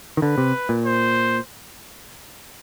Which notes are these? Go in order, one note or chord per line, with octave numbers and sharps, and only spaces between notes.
D#3
D3 B4
C3
A#2
C5